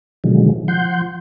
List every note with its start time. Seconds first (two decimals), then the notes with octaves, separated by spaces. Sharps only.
0.24 B2 D3 D#3 F3 F#3 G#3
0.68 F3 F#5 C6 G6